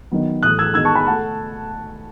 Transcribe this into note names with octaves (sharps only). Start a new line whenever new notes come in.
D#3 F#3 B3
A2 E3 A3 D#6 F#6
E6 G#6
D#3 G#3 B3 E6 G#6
A5 C#6
G#5 B5
A3 F#5 A5